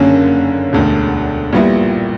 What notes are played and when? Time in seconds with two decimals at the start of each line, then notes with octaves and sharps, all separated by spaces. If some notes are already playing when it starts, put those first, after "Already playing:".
Already playing: F#1 F#2 D3 A#3 C#4
0.73 E1 D2 D3
1.53 A#1 A#2 G3 B3 E4